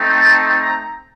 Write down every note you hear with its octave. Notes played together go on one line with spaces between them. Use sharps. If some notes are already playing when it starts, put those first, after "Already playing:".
Already playing: A3 C4 D#4
A5
A#5